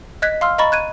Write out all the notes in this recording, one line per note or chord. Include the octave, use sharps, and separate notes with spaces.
D#5 F#6 G#6 B6
F5 C6 E6 F6
D#5 A#5 B5 C#6 A6
F#6 G#6 D#7